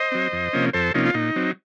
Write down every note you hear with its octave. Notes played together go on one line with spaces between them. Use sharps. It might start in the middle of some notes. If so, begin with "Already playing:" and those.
Already playing: C5 D#5
F#3 C4
F2
C3 F3 A#3 C#4
F2 A4 C5
C3 F3 A#3 C#4 D#4
F4
A#2 D#4
F#3 C4